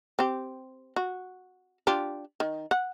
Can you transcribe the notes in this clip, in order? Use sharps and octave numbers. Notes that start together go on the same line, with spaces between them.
C4 G4
F#4
D4 F4 G4
D#3
F#5